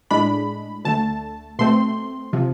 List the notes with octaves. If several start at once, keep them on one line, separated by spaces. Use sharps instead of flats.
A2 G#3 D4 B5
D2 D3 A3 A5
B2 A3 C4 C6
C3 F3